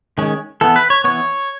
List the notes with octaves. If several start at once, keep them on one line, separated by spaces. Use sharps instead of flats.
D#3 G#3 C#4
E3 B3 A4
B4
C#5
E3 B3 C#5